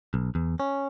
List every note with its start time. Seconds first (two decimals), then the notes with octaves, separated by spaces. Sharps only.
0.14 B1
0.35 E2
0.60 C#4